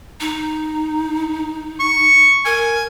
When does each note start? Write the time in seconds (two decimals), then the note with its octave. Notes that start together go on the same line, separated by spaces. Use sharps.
0.20 D#4
1.80 C#6
2.46 A#4 G#5